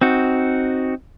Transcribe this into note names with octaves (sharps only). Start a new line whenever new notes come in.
C4 D#4 F#4